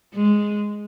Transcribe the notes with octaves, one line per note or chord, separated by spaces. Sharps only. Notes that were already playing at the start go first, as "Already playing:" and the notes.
G#3